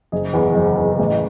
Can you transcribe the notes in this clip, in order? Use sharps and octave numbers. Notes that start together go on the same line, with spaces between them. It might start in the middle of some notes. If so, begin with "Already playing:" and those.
F#1 G#4
E2 C#3
F#1
E2 C#3
A1